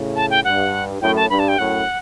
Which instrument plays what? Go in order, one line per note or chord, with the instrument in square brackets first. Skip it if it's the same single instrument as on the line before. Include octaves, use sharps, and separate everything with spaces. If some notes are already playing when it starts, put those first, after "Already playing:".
Already playing: [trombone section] A2 C#3
[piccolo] A5
G5
[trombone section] G2 [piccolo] F#5
[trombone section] F#2 A2 [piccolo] G5
[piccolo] A5
[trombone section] G2 [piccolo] B5
[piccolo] A5
G5
[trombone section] F#2 A2 [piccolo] F#5